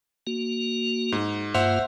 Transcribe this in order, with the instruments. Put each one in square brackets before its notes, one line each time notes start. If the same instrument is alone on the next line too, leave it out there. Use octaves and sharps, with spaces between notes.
[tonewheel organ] A#3 F#4
[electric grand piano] G#2
[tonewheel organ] G2 A#3 F4 [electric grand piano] C5 E5 F#5